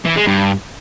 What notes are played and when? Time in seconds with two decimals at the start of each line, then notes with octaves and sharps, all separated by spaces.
0.05 E3
0.16 G#3
0.27 G2